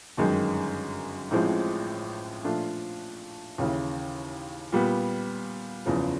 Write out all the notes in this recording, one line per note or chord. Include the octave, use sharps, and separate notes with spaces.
G1 F#2 D#3 G#3
A1 A2 F3 G#3 C4
A#2 F3 A3 D4 F4
D#2 C#3 E3
A#2 G3 B3
F#1 E2 C#3 F3